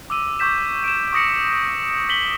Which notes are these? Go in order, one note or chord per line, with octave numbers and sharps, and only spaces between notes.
D6 E6 D#7
C#6 D6 G6 B6 E7
D7 E7
C#6 D#6 A#6 C#7
B6 F#7 G7